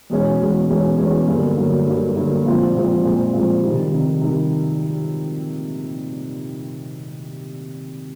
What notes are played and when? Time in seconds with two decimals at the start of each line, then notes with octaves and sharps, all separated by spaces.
0.10 E2 B2 G#3 C#4
0.40 E2 B2 G#3 C#4
0.69 E2 B2 G#3 C#4
0.98 E2 B2 G#3 C#4
1.27 G2 D3 F#3 A#3
1.57 G2 D3 F#3 A#3
1.87 G2 D3 F#3 A#3
2.16 G2 D3 F#3 A#3
2.45 A#2 F3 G#3 C4 F4
2.74 A#2 F3 G#3 C4 F4
3.04 A#2 F3 G#3 C4 F4
3.33 A#2 F3 G#3 C4 F4
3.63 C3 D#3 G3
3.92 C3 D#3 G3
4.21 C3 D#3 G3